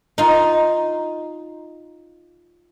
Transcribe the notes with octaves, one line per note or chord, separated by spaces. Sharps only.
D#4 F4